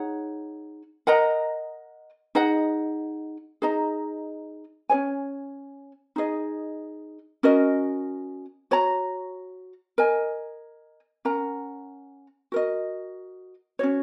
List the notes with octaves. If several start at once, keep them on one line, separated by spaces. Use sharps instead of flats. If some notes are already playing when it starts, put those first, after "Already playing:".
Already playing: D#4 G#4 C#5 F#5
A#4 D#5 F#5 A#5
D#4 G#4 D#5 F#5
D#4 G#4 D#5 A#5
C#4 G#4 C#5 G#5
D#4 G#4 D#5
C#4 F#4 A#4 D#5
F#4 C#5 A#5
A#4 D#5 G#5
C#4 A#4 F#5 A#5
F#4 A#4 D#5
C#4 F#4 C#5